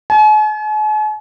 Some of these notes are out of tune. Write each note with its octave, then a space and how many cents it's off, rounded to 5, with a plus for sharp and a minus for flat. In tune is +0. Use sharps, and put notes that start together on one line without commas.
G#5 +45